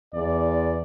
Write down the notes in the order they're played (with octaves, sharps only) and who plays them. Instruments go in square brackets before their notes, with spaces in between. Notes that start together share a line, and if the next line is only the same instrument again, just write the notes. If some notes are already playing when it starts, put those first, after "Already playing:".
[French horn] E2 [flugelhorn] D5